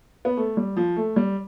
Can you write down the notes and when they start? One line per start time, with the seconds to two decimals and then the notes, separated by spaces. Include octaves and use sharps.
0.25 B3
0.37 A3
0.57 G3
0.77 F3
0.97 A3
1.16 G3